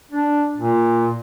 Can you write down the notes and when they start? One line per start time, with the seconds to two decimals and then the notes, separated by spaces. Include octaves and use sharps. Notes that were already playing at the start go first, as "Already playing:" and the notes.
0.11 D4
0.57 A#2